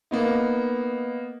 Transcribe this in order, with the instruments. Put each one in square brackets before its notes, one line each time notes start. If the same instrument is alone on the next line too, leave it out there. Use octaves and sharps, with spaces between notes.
[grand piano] A#3 B3 D#4